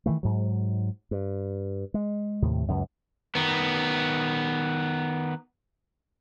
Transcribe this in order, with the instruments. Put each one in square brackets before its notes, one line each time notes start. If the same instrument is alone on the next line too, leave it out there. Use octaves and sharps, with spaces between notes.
[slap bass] D#3 E3 A3
G#2 F#3
G2
G#3
D#2 A2 C3
C#2 F#2
[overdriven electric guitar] D#3 B3